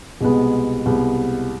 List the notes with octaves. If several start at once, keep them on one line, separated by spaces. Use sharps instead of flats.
C2 B2 G#3 B3
C2 B2 G#3 B3